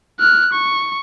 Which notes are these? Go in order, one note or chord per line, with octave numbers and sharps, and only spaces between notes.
F6 F#6
C#6